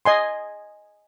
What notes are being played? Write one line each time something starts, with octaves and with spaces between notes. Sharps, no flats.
D#5 G#5 C6